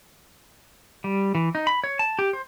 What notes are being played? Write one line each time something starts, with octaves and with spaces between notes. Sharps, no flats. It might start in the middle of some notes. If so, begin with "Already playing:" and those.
G3
E3
D#4
B5
C#5
A5
G4
C5